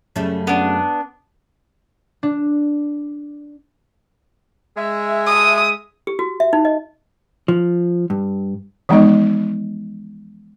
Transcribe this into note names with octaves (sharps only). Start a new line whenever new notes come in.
F#2 C#3 G3 A3
B3 D4
D4
G#3 E5
D#6
G4
F#4
E5
D#4
D#5
F3
G2
E3 F3 G#3 B3 D#4 D#5